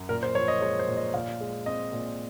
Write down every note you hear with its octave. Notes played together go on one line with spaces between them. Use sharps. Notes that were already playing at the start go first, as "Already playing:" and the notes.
Already playing: F#2
A#2 A#4
C5
F3 C#5
D#5
G#3 C#5
C5
A#2
D#5
A#2 F5
G#3
C4 D#5
A#2